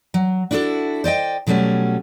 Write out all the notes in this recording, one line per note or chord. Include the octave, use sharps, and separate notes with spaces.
F#3
D4 E4 F#4 G#4 A4
C5 D5 D#5 G5
B2 F#3 G3 A3 C#4